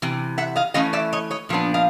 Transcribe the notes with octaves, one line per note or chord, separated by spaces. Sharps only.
C3 E3
E5 F#5
D#5 F5
E3 A3 C#4 D#5 F5
D5 E5
C#5 D#5
C#5 D#5
A#2 F3 B3 D4
D#5 F5